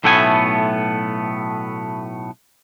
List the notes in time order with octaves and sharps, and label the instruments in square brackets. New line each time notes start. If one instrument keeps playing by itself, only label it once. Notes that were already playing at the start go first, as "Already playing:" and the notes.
[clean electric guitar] B1 A2 A3 B3 G5 G#5